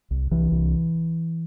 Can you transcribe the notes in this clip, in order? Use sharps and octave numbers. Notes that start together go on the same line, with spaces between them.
C2
C2 E3
C2